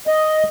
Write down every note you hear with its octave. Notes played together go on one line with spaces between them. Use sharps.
D#5